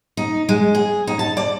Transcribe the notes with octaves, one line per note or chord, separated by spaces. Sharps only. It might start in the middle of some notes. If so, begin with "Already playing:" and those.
D#4
G#3
G#4
D#4
A5
D5